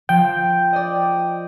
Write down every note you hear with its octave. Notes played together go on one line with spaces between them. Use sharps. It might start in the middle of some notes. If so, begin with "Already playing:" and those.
F3 G5
D5 D#5